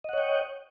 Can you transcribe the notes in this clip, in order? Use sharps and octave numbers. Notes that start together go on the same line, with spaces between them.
C#5 D#5 F#5 G5